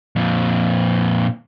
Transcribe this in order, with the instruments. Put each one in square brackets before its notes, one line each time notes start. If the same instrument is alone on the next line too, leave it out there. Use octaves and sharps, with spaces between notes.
[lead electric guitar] F2 A#2